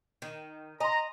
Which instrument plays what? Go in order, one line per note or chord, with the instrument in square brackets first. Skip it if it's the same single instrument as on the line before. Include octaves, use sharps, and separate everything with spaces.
[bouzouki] D#3
[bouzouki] D#5 [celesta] G#5 C6 [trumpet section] A#5